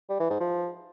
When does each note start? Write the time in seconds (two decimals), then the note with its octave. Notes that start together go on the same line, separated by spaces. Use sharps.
0.09 G3
0.20 E3
0.30 G#2
0.40 F3